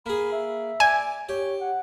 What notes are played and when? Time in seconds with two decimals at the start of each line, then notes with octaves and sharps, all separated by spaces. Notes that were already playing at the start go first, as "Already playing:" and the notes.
0.06 A#3 G#4 B5
0.32 E5
0.80 D5 G#5
1.29 G4 C#5
1.61 F#5